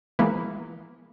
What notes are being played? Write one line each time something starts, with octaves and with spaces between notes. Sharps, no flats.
E3 F3 G#3 A#3 B3